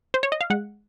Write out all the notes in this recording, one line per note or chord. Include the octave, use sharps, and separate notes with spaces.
C5
C#5
D#5
F5
G#3 F#5